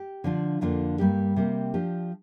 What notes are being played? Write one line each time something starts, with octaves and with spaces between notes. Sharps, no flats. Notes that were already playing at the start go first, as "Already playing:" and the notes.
Already playing: G4
D3 F3 D4 F4
F2 D3 A#3 D4 F4
G2 G3 A#3 G4
C3 G3 A#3 G4
F3 D4 G4